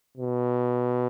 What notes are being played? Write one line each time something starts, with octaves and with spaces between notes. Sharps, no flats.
B2